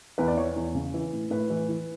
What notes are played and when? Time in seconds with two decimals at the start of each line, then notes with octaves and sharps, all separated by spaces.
0.18 E2 B4
0.28 D5
0.37 E3 C#5
0.56 E2
0.75 C#3
0.94 E3
1.13 A2
1.30 A2 B4
1.50 E3
1.69 E3